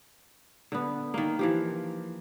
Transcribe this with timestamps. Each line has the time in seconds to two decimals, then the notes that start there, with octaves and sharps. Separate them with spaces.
0.72 D3 B3
1.14 D#3 A#3
1.39 E3 F3 G4